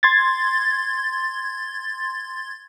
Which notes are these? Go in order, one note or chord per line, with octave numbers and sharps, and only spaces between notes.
C6 G#6 A6